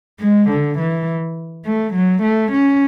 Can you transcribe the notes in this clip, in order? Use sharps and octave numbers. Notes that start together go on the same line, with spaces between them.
G#3
D3
E3
A3
F#3
A3
C#4